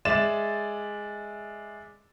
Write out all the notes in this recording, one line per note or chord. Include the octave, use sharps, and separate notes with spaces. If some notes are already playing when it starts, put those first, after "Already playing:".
G#3 D5 E5 A6 E7